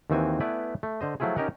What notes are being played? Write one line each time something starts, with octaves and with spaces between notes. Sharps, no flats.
D#2 D#3 E3 C4 F#4 G#5
A3 B3 E4 B4 D5 G#5
A3
D3 C5 D#5
F3 F#3 A3 E4 F4 G#4
C#4 D#4 G4 A#4 D#5 F#5